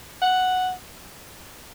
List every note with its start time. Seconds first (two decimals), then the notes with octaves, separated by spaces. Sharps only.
0.22 F#5